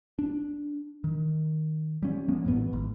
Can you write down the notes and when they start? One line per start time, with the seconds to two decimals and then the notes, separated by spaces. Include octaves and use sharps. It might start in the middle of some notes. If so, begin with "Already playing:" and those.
0.19 D4
1.04 D#3
2.03 G3 C#4
2.28 F3 A#3 B3 C#4
2.45 A1 G2 E3 B3
2.73 G#1